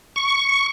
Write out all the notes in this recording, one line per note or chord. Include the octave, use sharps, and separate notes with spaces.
C#6